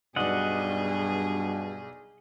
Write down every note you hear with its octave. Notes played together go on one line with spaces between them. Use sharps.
B1 G2 B2 G#4 D5 D#5 F#5